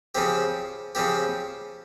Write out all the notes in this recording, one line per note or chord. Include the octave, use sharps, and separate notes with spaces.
C#3 F3 C4 G4
C#3 F3 C4 G4